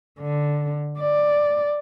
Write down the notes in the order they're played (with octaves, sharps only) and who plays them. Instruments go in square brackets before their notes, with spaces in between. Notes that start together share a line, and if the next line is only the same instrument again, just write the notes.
[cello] D3
D5